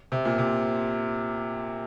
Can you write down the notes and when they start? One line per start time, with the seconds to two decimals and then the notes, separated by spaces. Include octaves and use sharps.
0.12 C3
0.25 A#2
0.38 C3